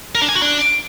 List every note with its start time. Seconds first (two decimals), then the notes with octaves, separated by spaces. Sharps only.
0.15 A#4
0.22 D4
0.29 G#5
0.35 F#4
0.42 D4